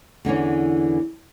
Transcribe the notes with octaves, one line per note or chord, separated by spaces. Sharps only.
E2 D3 E3 C#4